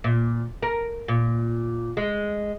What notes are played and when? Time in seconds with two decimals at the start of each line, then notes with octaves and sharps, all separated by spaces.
0.04 A#2
0.62 A#4
1.08 A#2
1.97 G#3